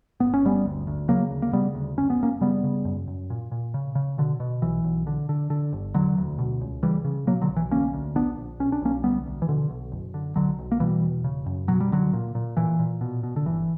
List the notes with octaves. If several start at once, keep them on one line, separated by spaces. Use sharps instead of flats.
G1 B3
C#4
G1 G3 B3
D2
D2
C#3 F#3 A#3
D2
A#3
C#3 G3 B3
D2
F#1 C#4
B3
F#1 A#3 C#4
C#3 G3 B3
C#3
F#2
F#2
A#2
A#2
C#3
C#3
B2 D3
B2
B1 E3
B1
D3
D3
D3
G1
E1 D3 F#3
D2
B2
C#2
C#3 E3 G3
C#3
B2 F#3 A#3
D3 F#3
B1
E3
D2 A#3 C#4
D2
A#1 B3 D4
A#1
B1 C#4
D4
B1 A#3 C#4
D2 G3 B3
D2
E3
B2 D3
B1
F#1
D3
B1 D3 F#3
B1
A#3
B2 E3 G3
E1
C#3
F#2
B2 F#3
G3
C#2 D3 F#3
A#2
A#2
A#2 E3
A#2
B2
B2
D3
G1 E3